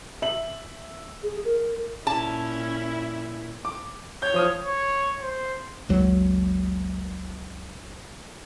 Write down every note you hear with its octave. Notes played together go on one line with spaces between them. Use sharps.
E5 F#7
G#4
A#4
A#2 C#4 E4 A5
D6
C#5 G6
F3 D#6 F6
C#5
C5
F#1 C#2 F#3